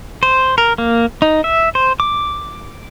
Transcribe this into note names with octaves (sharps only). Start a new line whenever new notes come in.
C5
A#4
A#3
D#4
E5
C5
D6